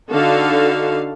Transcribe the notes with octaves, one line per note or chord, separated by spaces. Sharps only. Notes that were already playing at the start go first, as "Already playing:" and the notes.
D3 D#4 F#4 A4 F5